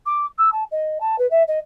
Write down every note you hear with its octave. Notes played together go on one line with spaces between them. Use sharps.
D6
E6
A5
D#5
A5
B4
E5
D#5